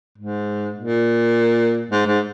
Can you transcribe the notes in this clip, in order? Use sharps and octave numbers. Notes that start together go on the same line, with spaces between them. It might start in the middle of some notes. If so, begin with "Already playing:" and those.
G#2
A#2
G#2
G#2